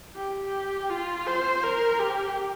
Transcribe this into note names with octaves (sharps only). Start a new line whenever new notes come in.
G4
F4
C5
A#4
G4